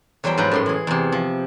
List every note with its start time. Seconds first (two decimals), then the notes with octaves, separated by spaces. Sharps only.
0.24 E2 F#3 G3 C5 G5
0.37 G#2 F3 B4 G5 A#5
0.51 F#2 A2 C6
0.66 E3 G#4
0.87 E2 C3
1.12 F3